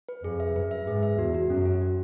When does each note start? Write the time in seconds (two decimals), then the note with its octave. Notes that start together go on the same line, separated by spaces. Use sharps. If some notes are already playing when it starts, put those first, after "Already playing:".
0.09 B4
0.24 F2 G#4
0.40 E5
0.56 F#2 B4
0.71 E5
0.87 G#2 G#4
1.03 E5
1.19 E2 F#4
1.34 F#4
1.50 F#2 C#4
1.66 C#4
1.81 F#4